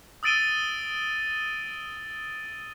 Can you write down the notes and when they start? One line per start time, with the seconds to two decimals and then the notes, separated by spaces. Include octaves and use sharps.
0.23 D#6 E6 A6 D7 D#7 G7